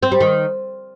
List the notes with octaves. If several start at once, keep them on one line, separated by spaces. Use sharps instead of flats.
C4
G3
D#3